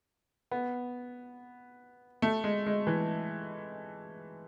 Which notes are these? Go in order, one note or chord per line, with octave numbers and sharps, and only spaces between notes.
B3
A3
G#3
G#3
E3